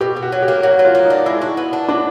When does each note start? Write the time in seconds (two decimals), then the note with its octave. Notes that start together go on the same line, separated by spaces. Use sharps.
0.01 B2 G4
0.17 B2
0.22 F#4
0.32 F#3
0.42 G4
0.48 A#3
0.63 F#3 F#4
0.79 F#3
0.85 F4
0.95 A#3
1.05 D#4
1.10 D4
1.26 G#3 E4
1.42 F#4
1.57 B3
1.73 D4
1.88 F#3 D4